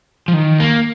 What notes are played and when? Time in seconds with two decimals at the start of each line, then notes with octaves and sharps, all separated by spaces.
0.28 F3
0.34 D#3
0.60 A#3